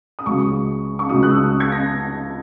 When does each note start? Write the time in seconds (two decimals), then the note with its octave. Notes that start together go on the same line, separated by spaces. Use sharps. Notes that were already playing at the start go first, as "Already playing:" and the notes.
0.19 D#6
0.26 C#2 C#3 F#3 C#6
0.99 C#6
1.09 C#2 C#3 F#3 D#6
1.23 F#6
1.31 E6
1.60 G#6
1.72 A#6